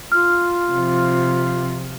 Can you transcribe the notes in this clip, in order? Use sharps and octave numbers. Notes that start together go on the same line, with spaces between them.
F4 F6
C3 F3